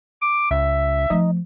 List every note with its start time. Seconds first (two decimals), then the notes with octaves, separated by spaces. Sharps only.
0.22 D6
0.51 C#2 E5
1.10 F3 A3 D#4